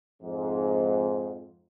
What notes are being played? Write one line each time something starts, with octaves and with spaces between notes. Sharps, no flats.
F2 G#2